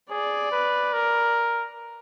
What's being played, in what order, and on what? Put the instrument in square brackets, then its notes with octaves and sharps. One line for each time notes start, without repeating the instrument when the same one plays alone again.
[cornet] G#4 [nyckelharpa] D5
[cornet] B4
A#4